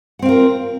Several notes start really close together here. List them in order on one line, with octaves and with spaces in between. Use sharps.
F#5 C4 F5 A#4 F4